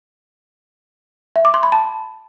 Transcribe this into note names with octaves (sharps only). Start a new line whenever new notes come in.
E5
D6
C6
B5
A5